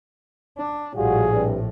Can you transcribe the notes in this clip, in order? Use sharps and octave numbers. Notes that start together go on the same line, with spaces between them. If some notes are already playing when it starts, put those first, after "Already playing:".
D4
A#1 A2 G3 F4 F#4 G#4
G2 C3 G3